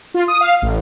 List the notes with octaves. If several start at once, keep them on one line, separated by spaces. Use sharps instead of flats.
F4
D#6
F5
A1